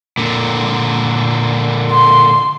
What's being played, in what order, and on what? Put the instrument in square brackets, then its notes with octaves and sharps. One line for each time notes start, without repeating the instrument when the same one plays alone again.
[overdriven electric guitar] A#2 D3
[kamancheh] C6